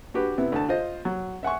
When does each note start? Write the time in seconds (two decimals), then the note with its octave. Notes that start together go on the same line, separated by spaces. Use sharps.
0.14 D4 F#4 G4 B4
0.38 C3 B3 E4
0.52 D2 A5
0.69 F4 C5 D#5
1.05 F#3
1.43 E5 F#5 G#5 C#6